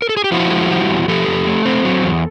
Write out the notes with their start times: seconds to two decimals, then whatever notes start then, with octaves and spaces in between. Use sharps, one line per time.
0.02 A#4
0.09 A4
0.17 G#4
0.24 G4
0.32 F3 E4 F#4
0.51 G#3
0.70 G3
0.90 E2
1.08 F3 G4 A4
1.27 F2
1.47 A3
1.65 C4
1.85 F#3
2.03 E2